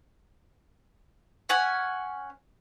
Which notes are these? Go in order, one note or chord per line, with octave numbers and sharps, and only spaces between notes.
C#4 F#5 G#5